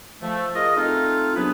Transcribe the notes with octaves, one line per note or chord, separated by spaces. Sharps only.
F3 A3
F4 G#4 A#4 D#5
A3 C4 D#4 F4
C3 F#3 B3 D4 G#4 B4